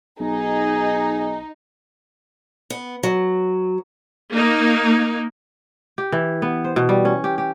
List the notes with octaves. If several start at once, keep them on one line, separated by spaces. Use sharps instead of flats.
B1 D#4 G#4
B3
F#3
A#3 D#4
G4
E3
B3
C5
B2
G3
C#4
G4
G4